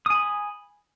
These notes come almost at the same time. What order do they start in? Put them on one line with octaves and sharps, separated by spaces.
D#6 G#5 B5